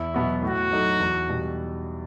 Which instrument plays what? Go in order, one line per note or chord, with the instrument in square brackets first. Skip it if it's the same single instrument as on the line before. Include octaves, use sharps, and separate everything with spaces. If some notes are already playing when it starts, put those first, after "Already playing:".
Already playing: [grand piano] E2 [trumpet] E4
[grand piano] B2 F#3 B3 F#4
[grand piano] A2 [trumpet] F#4
[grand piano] F#3 A3 D#4
E2
B2 G3